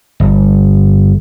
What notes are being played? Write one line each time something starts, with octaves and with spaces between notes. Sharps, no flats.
G1